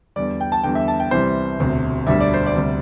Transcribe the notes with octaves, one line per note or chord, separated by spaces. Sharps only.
E2 D3 G3 D5
G5
A5
E2 D3 G3 G5
E5
A5
G5
C2 C3 E3 G3 C5
E1 D2 C3
E1 D2 D3 G3 E5
D5
C5
D5
D2 C3 G3